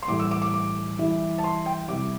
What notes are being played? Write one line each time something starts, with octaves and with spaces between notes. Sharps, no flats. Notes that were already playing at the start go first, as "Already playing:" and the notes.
C6
A2 E3 G3 D6
E6
D6
D6
D6
E3 G3 E4
A5
C6
G5
C3 G3 E4 D6